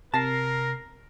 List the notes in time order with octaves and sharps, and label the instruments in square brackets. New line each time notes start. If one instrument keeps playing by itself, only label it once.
[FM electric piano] C3 A#6 C7 [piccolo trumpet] A#4 [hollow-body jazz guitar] A5